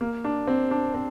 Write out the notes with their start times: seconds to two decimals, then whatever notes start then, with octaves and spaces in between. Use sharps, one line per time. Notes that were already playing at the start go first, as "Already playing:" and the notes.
0.01 A#3
0.24 D4
0.47 C4
0.71 D4
0.94 C4